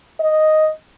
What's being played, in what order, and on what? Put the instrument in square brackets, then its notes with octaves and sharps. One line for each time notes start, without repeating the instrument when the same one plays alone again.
[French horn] D#5